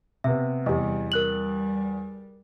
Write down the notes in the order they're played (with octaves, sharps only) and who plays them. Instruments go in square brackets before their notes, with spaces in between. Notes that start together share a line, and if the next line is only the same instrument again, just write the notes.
[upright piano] C3 B3 [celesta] E5
[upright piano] E2 [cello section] C3 G3 [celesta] G4 D#5
[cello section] G3 [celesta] A#4 F#6 F#7